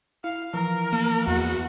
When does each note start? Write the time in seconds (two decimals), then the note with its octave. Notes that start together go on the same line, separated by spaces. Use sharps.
0.24 E4 F5
0.54 E3 F3 A#4
0.93 A#3
1.27 E2 F#4